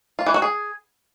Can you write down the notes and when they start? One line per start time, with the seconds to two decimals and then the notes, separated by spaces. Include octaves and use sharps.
0.19 F4
0.26 E3
0.34 F#4
0.42 G#4